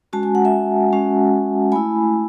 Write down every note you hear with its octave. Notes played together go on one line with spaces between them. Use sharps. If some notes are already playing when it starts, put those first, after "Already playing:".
G#3 C#4 F#4 A5
G#5
F#5
E5 G#5
G#3 C#4 F#4
A3 E4 G#5 B5